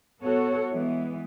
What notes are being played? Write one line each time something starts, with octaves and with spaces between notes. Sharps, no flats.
B3 F#4 A4 C#5
E3 G#3 B3